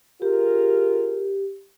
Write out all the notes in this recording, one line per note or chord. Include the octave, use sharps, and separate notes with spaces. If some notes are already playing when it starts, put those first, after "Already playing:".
F4 G4 G#4 A#4